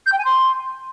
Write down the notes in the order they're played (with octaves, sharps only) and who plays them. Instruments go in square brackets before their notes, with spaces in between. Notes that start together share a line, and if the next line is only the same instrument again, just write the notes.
[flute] G6
G5
G#5
C6